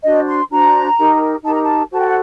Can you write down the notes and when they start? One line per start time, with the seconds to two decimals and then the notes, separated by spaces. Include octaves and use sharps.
0.04 D4 F#4 C5 D#5
0.27 C6
0.51 D4 F#4 C5 A#5
0.97 D#4 G4 A#4
1.44 D#4 G4 A#4 A5
1.53 A#5
1.62 A5
1.92 F#4 A4 C5 A5
1.99 G5
2.07 F#5